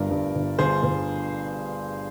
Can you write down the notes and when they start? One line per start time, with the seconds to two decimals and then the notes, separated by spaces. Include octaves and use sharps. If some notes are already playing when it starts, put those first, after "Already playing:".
Already playing: G1 G2 A#4 D5
0.11 G2
0.35 G1
0.59 G1 G#4 C5
0.83 G1